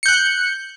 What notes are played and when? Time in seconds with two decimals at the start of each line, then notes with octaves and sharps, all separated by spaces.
0.03 C#7
0.06 G6
0.08 F#6